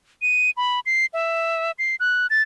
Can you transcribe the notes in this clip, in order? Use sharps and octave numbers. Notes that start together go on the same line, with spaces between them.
D#7
B5
C7
E5
C7
F#6
A6